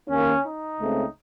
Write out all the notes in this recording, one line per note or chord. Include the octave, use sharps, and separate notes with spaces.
D#2 D#3 A#3 C#4
D#4
C#2 C#3 A3 C4